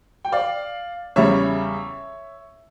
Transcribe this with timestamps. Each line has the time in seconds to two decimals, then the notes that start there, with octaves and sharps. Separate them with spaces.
0.25 G5
0.32 D5 F5
1.16 E2 C#3 G3 C#5 E5